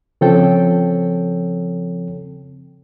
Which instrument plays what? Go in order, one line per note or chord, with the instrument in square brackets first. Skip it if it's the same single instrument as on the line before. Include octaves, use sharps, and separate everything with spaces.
[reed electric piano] C#3 F3 C4 A4 C#5 G5